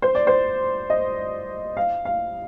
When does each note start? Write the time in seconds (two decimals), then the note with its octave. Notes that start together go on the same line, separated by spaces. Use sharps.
0.02 C5
0.15 D5
0.27 C5
0.90 D#5
1.77 F5
2.05 F5